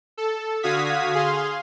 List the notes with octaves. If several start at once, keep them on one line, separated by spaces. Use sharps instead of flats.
A4
D3 F#4 F5 D#6 G#6 B6
G#4 F5 C6